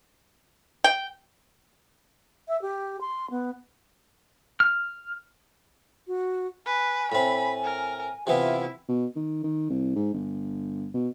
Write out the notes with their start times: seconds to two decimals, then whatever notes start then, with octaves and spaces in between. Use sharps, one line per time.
0.84 G5
2.48 E5
2.62 G4
3.01 C6
3.30 B3
4.60 F6
6.07 F#4
6.66 B4 G#5
7.12 A2 C4 B5
7.64 A#4
8.27 C3 E3 B3 E4 F4
8.88 B2
9.16 D#3
9.44 D#3
9.70 C2
9.96 G#2
10.14 G1
10.94 B2